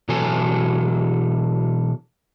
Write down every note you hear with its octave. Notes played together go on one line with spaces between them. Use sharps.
B2 E3 F#3 A4 G#5